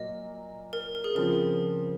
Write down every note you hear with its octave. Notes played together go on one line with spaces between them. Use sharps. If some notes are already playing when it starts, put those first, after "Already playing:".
Already playing: A#2 F#3 A#3 D#5
A#4
A#4
G#4
C#3 F3 C4 A#4